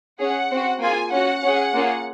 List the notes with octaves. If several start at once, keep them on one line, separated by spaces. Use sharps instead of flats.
C#4 G#4 F#5
C4 F#4
A#3 F4 G#4 G#5
C#4 F#4 F#5
C#4 G#4
A#3 C#4 F4 G#4